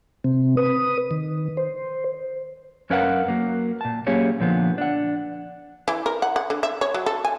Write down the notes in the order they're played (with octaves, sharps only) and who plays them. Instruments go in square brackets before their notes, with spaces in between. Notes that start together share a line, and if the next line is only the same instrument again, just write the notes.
[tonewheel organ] C3 C4
B4 D#6
D#3
C5
[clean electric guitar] F#2 C#4 A#4 B4 F5 F#5
F#3 A#3
A#2 A5
F#3 A#3 C#4 G4 G#4 C#5
A#2 D3 F3 B3
D4 F#5
[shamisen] E3
A#4
F#5
F#5
D3
E5
C#5
F#3
A4
G#5